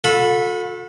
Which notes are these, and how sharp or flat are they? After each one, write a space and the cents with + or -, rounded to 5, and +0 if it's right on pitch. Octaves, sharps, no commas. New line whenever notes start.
F#4 -45 A4 +0 B5 +0